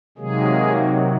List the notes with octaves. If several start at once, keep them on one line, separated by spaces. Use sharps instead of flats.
C3 D#3 F#3 G#3 A#3 G#4